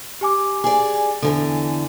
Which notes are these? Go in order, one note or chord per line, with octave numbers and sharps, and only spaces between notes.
G4 G#5 D6
G#4 D5
E2 G#2 D3 A4 G#5